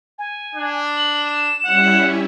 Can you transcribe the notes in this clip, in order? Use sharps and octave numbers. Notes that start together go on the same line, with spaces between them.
G#5
D4
F#7
E7
G3 C#4 E4 F#5